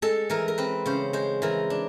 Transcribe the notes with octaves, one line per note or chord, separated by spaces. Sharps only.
G#3 A4
E3 A#4
A#4
C4 B4
C#3 C5
G#3 C5
E3 A#4
D4